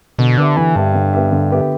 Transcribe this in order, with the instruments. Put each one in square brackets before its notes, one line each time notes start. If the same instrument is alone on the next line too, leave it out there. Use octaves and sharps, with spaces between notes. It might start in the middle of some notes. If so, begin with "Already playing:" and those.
[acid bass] B2 [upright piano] D3
[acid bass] D3 [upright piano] B3 G4 E5
[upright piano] D3 [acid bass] E3
[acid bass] G2 [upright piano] B3 G4 E5
[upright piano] D3
B3 G4 E5
D3
B3 G4 E5